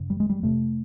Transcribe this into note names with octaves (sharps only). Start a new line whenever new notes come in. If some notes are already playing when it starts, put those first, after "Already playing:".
Already playing: F#2 C#3
G3
G#3
G3
F2 C3 A3